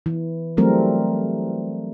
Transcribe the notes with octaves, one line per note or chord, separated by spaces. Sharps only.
E3
E3 F#3 G3 A3 C4 A#4